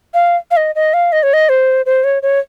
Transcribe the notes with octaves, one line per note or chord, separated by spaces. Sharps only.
F5
F5
D#5
D#5
F5
D#5
C#5
D#5
C5
C5
C#5
C#5